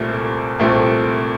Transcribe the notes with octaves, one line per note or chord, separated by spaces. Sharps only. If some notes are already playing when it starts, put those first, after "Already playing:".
Already playing: C2 A#2 A3 C4
C2 A#2 A3 C4